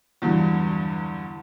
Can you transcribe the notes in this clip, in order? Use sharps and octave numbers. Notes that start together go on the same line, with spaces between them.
E2 G2 D3 E3 F#3